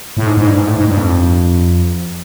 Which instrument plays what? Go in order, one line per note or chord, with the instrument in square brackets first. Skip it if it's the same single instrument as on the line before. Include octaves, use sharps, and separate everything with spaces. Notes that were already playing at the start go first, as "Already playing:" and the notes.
[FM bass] A2
G#2
G#2
G2
G#2
A2
G#2
G2
F2